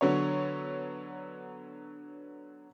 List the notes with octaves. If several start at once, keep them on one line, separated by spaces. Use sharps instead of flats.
D3 F#3 B3 C#5